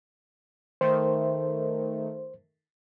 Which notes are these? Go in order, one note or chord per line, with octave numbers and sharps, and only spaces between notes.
D#3 A3 C5